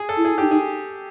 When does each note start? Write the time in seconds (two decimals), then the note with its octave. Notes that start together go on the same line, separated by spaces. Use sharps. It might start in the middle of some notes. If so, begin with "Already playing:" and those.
Already playing: G#4
0.09 A4
0.17 E4
0.25 G#4
0.38 D#4 G4
0.50 D#4 G#4